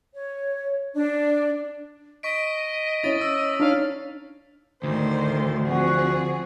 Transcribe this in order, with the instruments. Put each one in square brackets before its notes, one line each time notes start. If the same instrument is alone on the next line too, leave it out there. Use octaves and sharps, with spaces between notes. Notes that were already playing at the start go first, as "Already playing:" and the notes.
[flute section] C#5
D4
[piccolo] D#5 [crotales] C#6 B6 D7
[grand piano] C#4 E4 [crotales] D#6 A6
[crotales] E6
[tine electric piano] D4 D#4 C#5 [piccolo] F5
[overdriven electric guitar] D2 [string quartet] A2 D#3 C5
[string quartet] F3 C4 G#4 [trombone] F#4